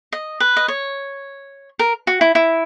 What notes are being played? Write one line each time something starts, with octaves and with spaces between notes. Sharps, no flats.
D#5
B4
D#5
C#5
A#4
F#4
E4
E4